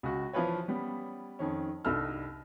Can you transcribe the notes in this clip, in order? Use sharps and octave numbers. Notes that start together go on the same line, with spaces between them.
C#2 F#4
E3 F3 F4 B4 C#5
G3 B3 C#4
F2 D#3 C#4
C2 G2 D#4 A4 E6 F6